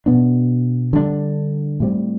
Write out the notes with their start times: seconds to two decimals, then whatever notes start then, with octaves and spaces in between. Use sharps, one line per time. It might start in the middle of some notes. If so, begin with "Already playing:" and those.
0.06 B2 B3 D4
0.93 D3 G3 B3 D4
1.80 A2 G3 C4